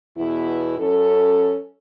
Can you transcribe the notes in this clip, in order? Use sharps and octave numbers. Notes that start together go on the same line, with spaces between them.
E2 B2 E4
F#2 C#4 A4